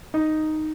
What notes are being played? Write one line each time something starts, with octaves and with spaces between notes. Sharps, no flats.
D#4